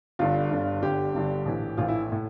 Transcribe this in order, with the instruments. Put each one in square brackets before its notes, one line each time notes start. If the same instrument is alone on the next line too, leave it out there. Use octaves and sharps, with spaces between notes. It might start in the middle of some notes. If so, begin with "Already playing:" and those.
[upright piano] G1 G2 D3 F4
G1 G2 D3
G1 G2 D3 G4
G1 G2 D3
A#1 A2 E3
A#1 A2 E3 F4
E4
A2